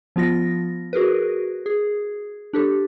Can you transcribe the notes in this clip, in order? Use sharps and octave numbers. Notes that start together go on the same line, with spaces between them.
F3 B3 F4 A#6
F#4 G#4 A#4 B4
G#4
D4 G4 A4